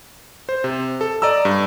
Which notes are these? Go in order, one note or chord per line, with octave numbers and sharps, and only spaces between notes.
C5
C3
A4
D5 D#5 A#5 E6
G2